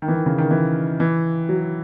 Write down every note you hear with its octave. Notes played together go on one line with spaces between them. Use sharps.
D#3
E3
D#3
C#3
D#3
E3
E3
F#3